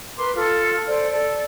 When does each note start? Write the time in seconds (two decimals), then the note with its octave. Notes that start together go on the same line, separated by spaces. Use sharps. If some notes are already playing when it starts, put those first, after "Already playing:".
0.18 A#4 B4 C6 D6
0.35 F4 A4
0.88 A4 C5 D5
1.11 A4 D5